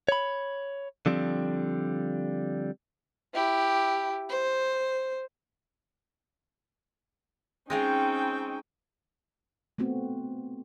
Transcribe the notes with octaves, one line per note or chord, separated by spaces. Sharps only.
C#5 B5
D3 F3 G3 C4
E4 G4
C5
G#3 C4 C#4 D#4 F4 G#4 G5
A3 B3 C4 F#4